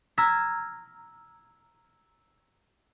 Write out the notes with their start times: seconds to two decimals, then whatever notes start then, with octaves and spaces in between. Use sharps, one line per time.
0.18 A#5 E6 F6 G#6 B6